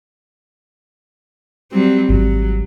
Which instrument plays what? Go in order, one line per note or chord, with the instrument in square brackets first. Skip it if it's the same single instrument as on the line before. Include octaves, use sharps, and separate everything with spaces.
[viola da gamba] F#3 G3 C4
[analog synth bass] G#1 [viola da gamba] F#3